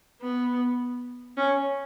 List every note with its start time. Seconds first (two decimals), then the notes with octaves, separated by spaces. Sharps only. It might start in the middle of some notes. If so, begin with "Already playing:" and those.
0.22 B3
1.38 C#4